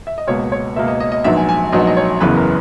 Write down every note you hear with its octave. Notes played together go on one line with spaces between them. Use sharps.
E5
D#5
C#2 B2 A#3 C#5
C#5
C#2 B2 A#3 E5
D#5
D#5
D#5
A#1 G#2 F#3 B3 E5
G#5
G#5
A#1 G#2 F#3 B3 D#5
D#5
C#5
F#1 E2 C#3 E3 B3 B4
A#4